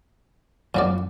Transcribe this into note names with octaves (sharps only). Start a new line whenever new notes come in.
F#2 A#2 F3 F#3 D5